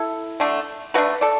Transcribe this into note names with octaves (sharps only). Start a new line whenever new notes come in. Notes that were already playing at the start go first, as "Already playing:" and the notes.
Already playing: E4 A4
D3 A3 D4
D3 A3 D4 F#4 B4
A4 D5